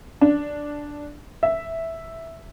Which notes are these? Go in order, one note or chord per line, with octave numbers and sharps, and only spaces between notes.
D4
E5